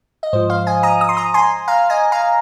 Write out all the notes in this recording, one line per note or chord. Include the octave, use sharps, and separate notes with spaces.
D#5
G#2 F3 C5
C5 F5
D#5 G#5
A#5 D#6
D#6
C6
A#5 D#6
G#5 C6
F5 A#5
D#5 G#5
F5 A#5